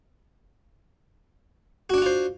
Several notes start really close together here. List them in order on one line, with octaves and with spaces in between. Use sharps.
F#4 D4 F#5 F4 C5